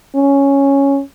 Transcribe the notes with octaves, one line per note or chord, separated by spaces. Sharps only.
C#4